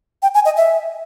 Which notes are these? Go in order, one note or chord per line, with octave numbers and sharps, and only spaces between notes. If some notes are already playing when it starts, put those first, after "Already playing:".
G5
G#5
D#5
E5